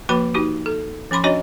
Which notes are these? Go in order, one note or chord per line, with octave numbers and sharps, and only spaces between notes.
F3 A#3 F#4 B4 B5
D#4 F#4 G4
A4
F3 C#4 B5 C6 D6
C#4 D4 F#4 C#5 D#5